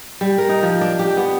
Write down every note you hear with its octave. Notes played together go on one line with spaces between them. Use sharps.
G3
A#4
D#4
F3
D4
G4
B3